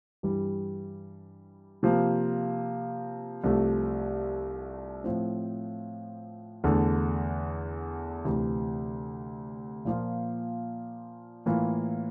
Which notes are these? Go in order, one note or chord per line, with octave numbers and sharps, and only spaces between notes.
G2 E3 G3
C3 F3 A#3
C2 C3 F3 A3
A2 F3 C4
E2 D3 A3
D2 C3 E3
A#2 F3 A#3 F4
A2 E3 A#3 F4